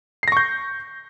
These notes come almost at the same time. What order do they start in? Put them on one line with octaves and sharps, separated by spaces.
C7 A#6 C#6 G6